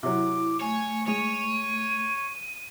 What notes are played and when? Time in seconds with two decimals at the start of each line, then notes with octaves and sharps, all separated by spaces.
0.03 C3 F#3 E4 D6
0.61 A3 C#5 G#5
1.07 G#3 C#5 D#7